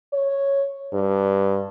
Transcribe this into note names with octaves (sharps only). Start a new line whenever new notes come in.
C#5
G2